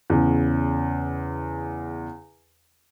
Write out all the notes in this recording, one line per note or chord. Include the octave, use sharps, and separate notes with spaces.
E2 C#3